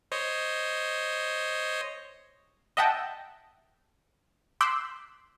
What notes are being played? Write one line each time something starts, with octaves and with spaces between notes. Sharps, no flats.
C5 C#5 D#5
D#5 E5 F#5 G5 A5
C6 D6 E6 F#6 G6 B6